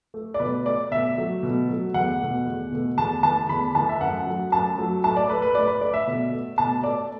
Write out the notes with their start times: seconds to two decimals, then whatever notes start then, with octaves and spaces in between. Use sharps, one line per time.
0.14 A3
0.34 D5
0.39 B2 B4
0.66 A3 D5
0.91 B2 E5
1.18 F#3 A3
1.43 B2
1.69 F#3 A3
1.94 E2 F#5
2.20 B2 A3
2.46 E2
2.72 B2 A3
2.97 E2 A5
3.23 E3 A3 A5
3.49 E2 B5
3.75 E3 A3 A5
3.89 E5
4.00 F#2 F#5
4.26 F#3 A3
4.52 F#2 A5
4.78 F#3 A3
5.04 A2 A5
5.17 D5
5.29 A3 B4
5.42 B4
5.55 A2 D5
5.68 B4
5.81 A3 D5
5.94 E5
6.07 B2
6.32 A3
6.58 B2 A5
6.83 A3 D5